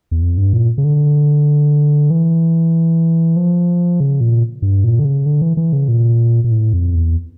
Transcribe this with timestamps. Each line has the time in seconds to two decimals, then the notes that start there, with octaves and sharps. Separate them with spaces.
0.11 E2
0.22 F2
0.37 G2
0.53 A#2
0.78 C#3
0.84 D3
2.10 E3
3.36 F3
4.00 C#3
4.21 A#2
4.62 G2
4.84 A#2
4.99 D3
5.05 C#3
5.26 D3
5.42 E3
5.57 E3
5.73 C#3
5.88 A#2
6.44 A#2
6.52 A2
6.73 F2
6.94 E2